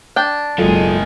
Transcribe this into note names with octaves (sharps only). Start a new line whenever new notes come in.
D4 G5
F#1 B1 D#3 F#3 G#3 F4 G#4 A4